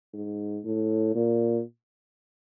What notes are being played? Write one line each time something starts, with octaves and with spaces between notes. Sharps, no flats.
G#2
A2
A#2